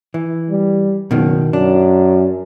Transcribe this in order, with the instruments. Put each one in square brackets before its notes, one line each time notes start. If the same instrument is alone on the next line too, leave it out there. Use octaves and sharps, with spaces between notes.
[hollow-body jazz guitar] E3
[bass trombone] G3
[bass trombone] F#1 [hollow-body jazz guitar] B2 D#3
[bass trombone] F#2 [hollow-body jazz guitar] D4